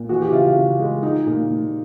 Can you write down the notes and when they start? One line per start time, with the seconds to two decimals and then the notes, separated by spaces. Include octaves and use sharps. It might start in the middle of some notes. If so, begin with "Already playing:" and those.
Already playing: A#2
0.09 E3 F#4
0.22 G4
0.33 C#3 F4
0.44 F4
0.56 C#3
0.80 G#3
1.03 F3 D#4
1.27 A#2
1.50 A#2